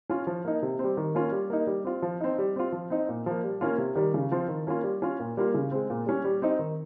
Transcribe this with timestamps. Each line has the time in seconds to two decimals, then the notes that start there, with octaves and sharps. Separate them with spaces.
0.10 C#4 F4
0.27 F3
0.45 A#3 D#4
0.62 C3
0.79 C4
0.84 G3
0.97 D#3
1.15 A#3 C#4 F4
1.32 G3
1.50 A#3 D#4
1.67 G3
1.84 C4 F4
2.02 F3
2.21 C4 D#4
2.38 G3
2.56 C4 F4
2.72 F3
2.90 C4 D#4
3.09 A#2
3.26 F3 A#3
3.44 G3
3.61 A#3 C#4 F4
3.78 C3
3.95 D#3 G3
4.14 C#3
4.32 F3 C4 F4
4.48 D#3
4.67 A#3 C#4 F4
4.84 G3
5.02 C#4 F4
5.20 A#2
5.37 G3 A#3 F4
5.54 C#3
5.71 G#3 C4
5.90 A#2
6.06 G3 C#4
6.24 G3
6.42 C4 D#4
6.59 D#3